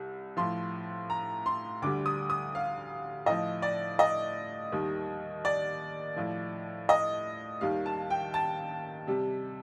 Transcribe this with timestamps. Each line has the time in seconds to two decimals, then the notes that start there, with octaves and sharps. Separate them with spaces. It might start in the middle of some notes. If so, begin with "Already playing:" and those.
Already playing: C2 C3
0.37 A2 F3 C6
1.10 A#5
1.46 C6
1.82 D2 D3 G3 D6
2.06 D#6
2.30 D#6
2.55 F5
3.26 A2 F3 D#5
3.62 D5
3.99 D#5
4.72 D#2 D#3 G3
5.45 D5
6.16 A2 F3
6.89 D#5
7.61 D#2 D#3 G3 F5
7.86 A5
8.10 G5
8.34 A5
9.07 C3 G3